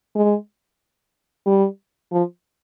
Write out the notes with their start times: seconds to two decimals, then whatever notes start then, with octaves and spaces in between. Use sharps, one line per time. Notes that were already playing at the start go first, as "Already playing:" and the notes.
0.16 G#3
1.46 G3
2.12 F3